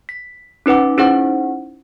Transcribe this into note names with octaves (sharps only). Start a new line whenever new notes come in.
B6
C#4 D#4 B4 F#5 D6
C#4 D#4 E4 G#4 C5 F#5